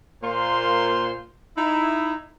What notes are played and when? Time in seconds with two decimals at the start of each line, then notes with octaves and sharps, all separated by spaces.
0.23 A#2 A#3 F4 C5 C6
1.57 D#4 E4